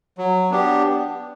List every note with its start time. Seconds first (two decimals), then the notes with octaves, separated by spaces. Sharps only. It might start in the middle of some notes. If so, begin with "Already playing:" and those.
0.18 F#3
0.51 B3 D4 G4